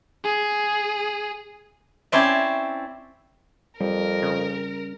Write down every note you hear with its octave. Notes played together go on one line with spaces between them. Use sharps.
G#4
C4 C#4 E4 C5 D5 A5
F2 G3 A#4
C#3